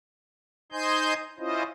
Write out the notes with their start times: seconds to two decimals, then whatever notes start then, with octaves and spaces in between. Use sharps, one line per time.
0.72 D#4 C5 D#5 G#5 C6 G6
1.39 C#4 E4 F4 C5 D#5